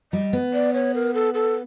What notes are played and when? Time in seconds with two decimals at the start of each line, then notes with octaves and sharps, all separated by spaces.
0.13 G3 D#5
0.33 B3
0.54 D5
0.74 C#5
0.95 A#4
1.14 A4
1.34 A4